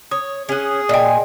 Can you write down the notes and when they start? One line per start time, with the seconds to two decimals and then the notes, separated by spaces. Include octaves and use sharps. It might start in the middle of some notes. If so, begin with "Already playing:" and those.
0.11 C#5 D#6
0.49 C#4 G#4 F#5
0.89 A#2 D5 D#5 G5 G#5